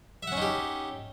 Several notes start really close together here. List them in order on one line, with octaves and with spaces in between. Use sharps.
E5 F#5 C#4 D#4 G4